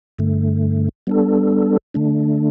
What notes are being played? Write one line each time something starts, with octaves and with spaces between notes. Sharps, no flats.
G2 D3 A3
G3 B3 D4 A4
D3 A3 D4